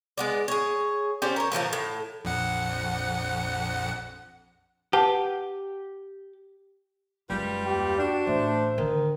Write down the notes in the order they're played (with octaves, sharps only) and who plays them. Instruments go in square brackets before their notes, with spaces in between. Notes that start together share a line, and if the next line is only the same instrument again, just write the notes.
[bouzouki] G#3 B3 D5
G#4 C#5
C#4 G4 C5 D5
A#4 C#5
A2 E3 F3 A#4
A2
[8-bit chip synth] A#1 F2 F#5
[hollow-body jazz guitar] G4 [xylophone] B4 F#5 A5
[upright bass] F#2 G#3 [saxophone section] G3 F4 B4
[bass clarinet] D#2 [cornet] G4
[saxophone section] D4 [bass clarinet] F#4
[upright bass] A1 [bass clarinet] A3 [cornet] C5
[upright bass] D3 [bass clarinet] D#3